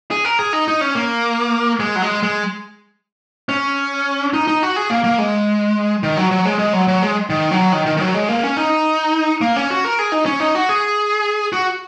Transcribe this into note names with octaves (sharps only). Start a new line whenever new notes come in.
G#4
A#4
G#4
D#4
D#4
C#4
A#3
G#3
F#3
G#3
G#3
C#4
D#4
D#4
F#4
G#4
A#3
A#3
G#3
D#3
F#3
F#3
G#3
G#3
F#3
F#3
G#3
D#3
F#3
D#3
D#3
D#3
F#3
G#3
A#3
C#4
D#4
A#3
C#4
F#4
A#4
G#4
D#4
C#4
D#4
F#4
G#4
F#4